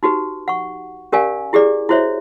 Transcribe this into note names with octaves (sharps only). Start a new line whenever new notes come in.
D#4 F#4 G4 B4
F#5 C#6
C#4 G4 A#4 D5 F5 G#5
E4 G4 G#4 D5
E4 F#4 C5 C#5 E5